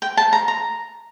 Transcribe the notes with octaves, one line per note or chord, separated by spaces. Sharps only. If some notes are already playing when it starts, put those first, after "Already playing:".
G5
A5
A#5
A#5